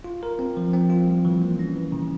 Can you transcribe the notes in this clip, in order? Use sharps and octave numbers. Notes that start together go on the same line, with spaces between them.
F4
A#4
C4
F3
C4
F4
G3
E3
A#3
C#4
E3
C#3